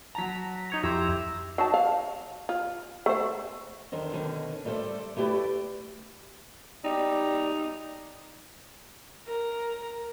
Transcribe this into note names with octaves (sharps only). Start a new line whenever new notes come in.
F#3 A5 A#5 A#6 B6
D#4 C#5 A#5
F2 E4 G4 A#5 C6 E6
F#3 D#4 A5
F5
F4
A3 C5
E2 D3 D#3 C5 D#5
B2 D3 D#3 C#4
G3 A3 A4 B4 C5 D5
A3 E4 G4 A#4 B4 D5
G3 D#4
A#4